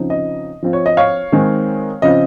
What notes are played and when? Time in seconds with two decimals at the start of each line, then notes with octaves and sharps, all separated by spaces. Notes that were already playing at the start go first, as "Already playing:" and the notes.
Already playing: C#3 F3 C4 D#4
0.10 D#5
0.63 F3 C4 F4
0.73 C#5
0.86 D#5
0.97 C#5 F5
1.32 D#3 G#3 C4 D#4
2.02 C#3 F3 C4 F4 D#5